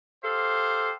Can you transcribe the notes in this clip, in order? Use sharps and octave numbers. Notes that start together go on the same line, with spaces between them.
G4 A4 C5 F5